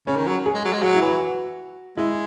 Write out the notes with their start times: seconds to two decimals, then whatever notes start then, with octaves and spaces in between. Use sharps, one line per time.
0.07 C#3 C#4
0.16 D#3
0.26 F#3
0.46 G#4
0.54 G#3
0.65 F#3
0.73 G#3
0.82 F#3 F#4
0.95 E4
1.02 E3 F#4
1.20 F#4
1.97 G#3 E4